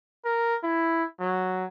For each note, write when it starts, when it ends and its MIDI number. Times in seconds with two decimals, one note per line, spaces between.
0.25 0.56 70
0.63 1.04 64
1.20 1.66 54